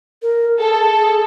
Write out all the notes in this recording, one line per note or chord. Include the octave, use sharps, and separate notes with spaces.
A#4
G#4 A4